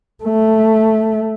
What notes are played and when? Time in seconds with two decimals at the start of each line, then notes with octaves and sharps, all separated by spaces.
0.24 A3